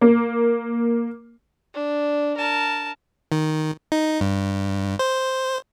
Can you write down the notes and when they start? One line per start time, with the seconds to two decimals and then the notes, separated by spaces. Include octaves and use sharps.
0.01 A#3
1.74 D4
2.37 A#4 A5
3.32 D#3
3.92 D#4
4.21 G2
4.99 C5